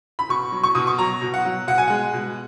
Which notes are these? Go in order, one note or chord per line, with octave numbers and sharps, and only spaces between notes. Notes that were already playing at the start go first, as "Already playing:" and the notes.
B5
B2 C#6
F#3
C#6
B2 D#6
C#6
F#3 A#5
B2
F#5
F#3
B2 F#5
G#5
G#3 F#5
B2